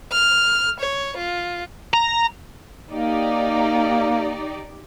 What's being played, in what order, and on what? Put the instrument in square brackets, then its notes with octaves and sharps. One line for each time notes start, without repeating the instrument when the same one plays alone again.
[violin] F6
C#5
F4
[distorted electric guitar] A#5
[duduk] A#3 [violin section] D#4 G4 D5